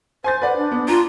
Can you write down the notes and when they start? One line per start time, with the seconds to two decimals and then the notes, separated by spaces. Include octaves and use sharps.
0.24 C5 G#5 C6 A6
0.42 B4 D5 F#5
0.57 D4
0.72 B3
0.88 F4 A#5